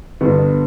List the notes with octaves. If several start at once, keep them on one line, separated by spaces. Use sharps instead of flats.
G1 G2 D3 B3